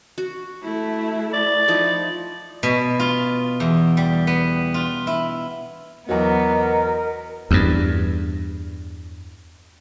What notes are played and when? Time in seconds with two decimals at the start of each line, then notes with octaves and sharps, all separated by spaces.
0.18 F#4
0.63 A3 E4
1.33 D5
1.68 F3 D#4 E4
2.63 B2
3.00 F4
3.60 E2
3.97 G3
4.27 B3
4.74 F4
5.07 E4
6.09 E2 F#3 B3 A#4 D#5
7.51 E2 G2